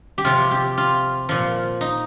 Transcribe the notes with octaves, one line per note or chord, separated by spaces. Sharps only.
G4
C3 F3 F4
G4
F4
A#2 F3
D#4